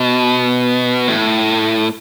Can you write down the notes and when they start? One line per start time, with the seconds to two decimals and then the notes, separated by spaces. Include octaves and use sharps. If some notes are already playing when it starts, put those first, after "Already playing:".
Already playing: B2
1.07 A2